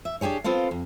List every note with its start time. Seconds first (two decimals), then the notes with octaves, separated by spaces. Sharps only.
0.05 E5
0.21 D4 D#4 G4 G#4 C#5
0.44 B3 C4 F4 A4 F5
0.71 F2